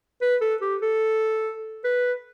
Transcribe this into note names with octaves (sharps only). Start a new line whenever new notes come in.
B4
A4
G4
A4
B4